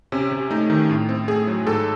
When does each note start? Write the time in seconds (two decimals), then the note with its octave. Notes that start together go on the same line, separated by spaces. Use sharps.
0.12 C3 C#4
0.32 C3
0.51 A3 D#4
0.70 D#3
0.89 A2
1.09 C4
1.28 A3 G#4
1.47 F#3
1.66 G#2 A4